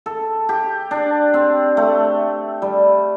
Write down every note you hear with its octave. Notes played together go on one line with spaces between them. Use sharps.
A4
G4
D4
C4
A3
G3